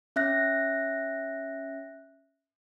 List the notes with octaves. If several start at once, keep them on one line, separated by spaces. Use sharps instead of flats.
C#4 E5 F#6 A#6